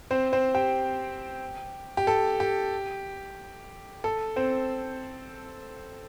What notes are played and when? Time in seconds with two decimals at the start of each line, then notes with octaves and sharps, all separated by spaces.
0.11 C4 C5
0.33 C4 C5
0.55 G4 G5
1.97 G4
2.07 A4
2.40 G4
4.04 A4
4.36 C4 C5